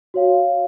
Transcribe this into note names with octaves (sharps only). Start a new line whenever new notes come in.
F#4 C#5 F5